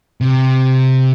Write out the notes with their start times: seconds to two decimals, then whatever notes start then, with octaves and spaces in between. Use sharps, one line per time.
0.21 C3